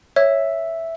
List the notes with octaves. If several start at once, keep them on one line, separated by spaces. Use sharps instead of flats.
C#5 E5